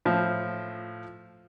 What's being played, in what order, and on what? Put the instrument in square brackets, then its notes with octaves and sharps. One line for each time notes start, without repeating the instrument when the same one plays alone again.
[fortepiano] A2 F3